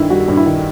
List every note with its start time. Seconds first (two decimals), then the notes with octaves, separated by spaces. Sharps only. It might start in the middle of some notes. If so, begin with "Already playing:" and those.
Already playing: G2 D#3 E4
0.10 G3 F#4
0.28 G2
0.37 E4
0.46 D#3